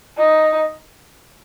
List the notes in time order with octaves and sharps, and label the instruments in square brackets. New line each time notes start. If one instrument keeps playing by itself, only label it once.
[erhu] D#4